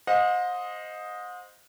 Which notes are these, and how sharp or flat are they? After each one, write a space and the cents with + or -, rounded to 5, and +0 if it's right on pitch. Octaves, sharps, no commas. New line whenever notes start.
C5 +0 D#5 +0 F#5 -45